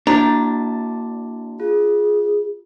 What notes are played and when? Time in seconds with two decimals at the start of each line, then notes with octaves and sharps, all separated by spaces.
0.07 A#3 D4 E4 F#4 A#5
1.60 F4 G#4